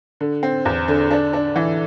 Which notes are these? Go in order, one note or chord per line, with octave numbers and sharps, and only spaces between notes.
D3
C4
E2
D3
D4
D4
E3